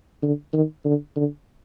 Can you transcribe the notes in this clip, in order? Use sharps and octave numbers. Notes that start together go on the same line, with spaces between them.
D3
D#3
D3
D3